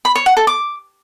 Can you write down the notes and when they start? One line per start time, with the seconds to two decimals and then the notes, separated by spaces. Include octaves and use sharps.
0.05 B5
0.15 C#5
0.26 F#5
0.37 A4
0.47 D6